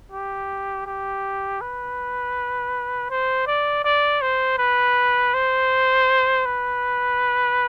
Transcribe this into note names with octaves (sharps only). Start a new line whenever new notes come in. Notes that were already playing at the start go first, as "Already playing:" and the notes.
G4
G4
B4
C5
D5
D5
C5
B4
C5
B4